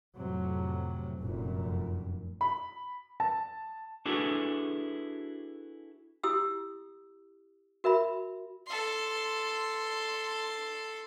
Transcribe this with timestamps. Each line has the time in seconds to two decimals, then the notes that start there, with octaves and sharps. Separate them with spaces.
0.15 F2 A2 C3 F#3
1.20 F1 F#2 A#2
2.41 B5
3.20 A5
4.05 D4 E4 F#4 G#4 A4 B4
6.23 E4 G4 D#6 E6
7.84 F#4 A#4 E5 B5
8.67 A4 C6